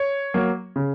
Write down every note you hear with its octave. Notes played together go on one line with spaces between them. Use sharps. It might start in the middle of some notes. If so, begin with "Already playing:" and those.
Already playing: C#5
F#3 A#3
C#3